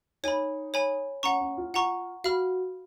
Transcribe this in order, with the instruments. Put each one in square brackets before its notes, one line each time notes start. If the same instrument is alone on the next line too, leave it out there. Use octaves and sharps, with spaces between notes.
[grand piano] D#4 [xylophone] C#5 G#5 B5
[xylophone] C#5 G#5 B5
[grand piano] C#4 [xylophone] F#5 A#5 C#6
[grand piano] C#4
F4
[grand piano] F4 [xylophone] F#5 A#5 C#6
[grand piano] F#4 [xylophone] F5 B5 F6